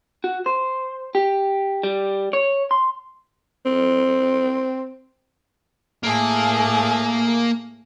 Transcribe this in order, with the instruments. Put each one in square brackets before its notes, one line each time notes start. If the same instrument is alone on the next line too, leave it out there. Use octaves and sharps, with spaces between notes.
[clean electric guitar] F#4
C5
G4
G3
C#5
C6
[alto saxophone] C4
[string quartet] A2 A3 G#4 [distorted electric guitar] A#3